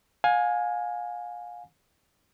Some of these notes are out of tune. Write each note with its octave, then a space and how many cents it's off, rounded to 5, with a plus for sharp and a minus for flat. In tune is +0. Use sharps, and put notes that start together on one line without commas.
F5 +35 G#5 +0